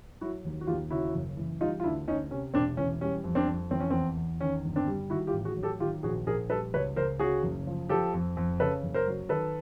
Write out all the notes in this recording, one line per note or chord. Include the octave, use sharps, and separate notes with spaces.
F#3 E4 F#4
D#2
F#4
D#2 F4 G4
C#3 E4 F#4
F#1
E3
G3 D#4 F4
F4
D2 D4 E4
D2 C#4 D#4
C3 C#4
E1 C4 D4
E3 C#4
G3 C#4
F2
C4 D4
F2
E3 C4
C#4
E2 C4
E2
D#3 C#4
G1
C4 D4
G3
D#3 E4 F#4
F4 G4
A1
F#4 G#4
F#3
G4 A4
D#3 F4 G4
A#1 F#4 G#4
A#1 G#4 A#4
G3 A4 B4
C#2 B4 C#5
C#2 A#4 C5
C#3 F#4 G#4
F#1
F3
F3 G4 A4
F2
F2
C#3 A4 B4
F#1
A#4 C5
F#3
D#3 A4 B4